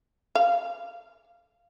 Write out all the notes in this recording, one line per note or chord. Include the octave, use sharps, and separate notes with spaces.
F5